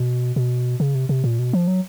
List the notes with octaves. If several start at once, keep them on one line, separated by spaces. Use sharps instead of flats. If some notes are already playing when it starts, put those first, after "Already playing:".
Already playing: B2
B2
C#3
C3
C3
A#2
B2
F3
F#3